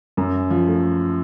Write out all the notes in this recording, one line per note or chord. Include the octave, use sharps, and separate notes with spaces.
F#2
F3
A3